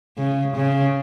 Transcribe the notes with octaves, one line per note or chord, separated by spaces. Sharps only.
C#3
C#3